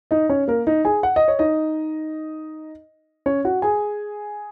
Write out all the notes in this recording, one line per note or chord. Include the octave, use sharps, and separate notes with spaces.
D#4 D#5
C#4 C#5
A#3 A#4
D#4 D#5
G#4 G#5
F#5
D#5
C#5
D#4 D#5
C#4 C#5
F#4 F#5
G#4 G#5